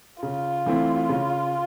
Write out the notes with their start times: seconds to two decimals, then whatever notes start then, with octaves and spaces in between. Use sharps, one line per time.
0.23 C#3 F4
0.66 E3 A3 C4 E4
1.09 C#3